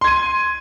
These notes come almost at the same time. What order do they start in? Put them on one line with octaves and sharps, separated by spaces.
C6 G#6 D#7